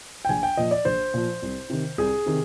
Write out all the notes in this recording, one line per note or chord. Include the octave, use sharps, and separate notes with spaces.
G5
A#1 G#5
G5
A#2 F3 D#5
D5
A#1 C5
A#2 F3
C2
C3 D#3
C2 G#4
C3 D#3